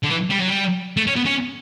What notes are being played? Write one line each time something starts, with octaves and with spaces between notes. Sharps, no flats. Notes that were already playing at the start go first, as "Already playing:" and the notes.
D3
E3
G3
F#3
G3
A3
C#4
B3
C#4